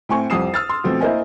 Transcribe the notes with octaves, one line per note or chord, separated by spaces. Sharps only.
A2 C4 G#5 C#6
C2 F2 G4 D#6 C7 E7
E6 F6 A6
C6
B2 F3 A3 C4
A#3 E4 A#4 C5 D#5 G#5